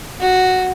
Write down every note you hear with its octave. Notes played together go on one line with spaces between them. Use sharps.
F#4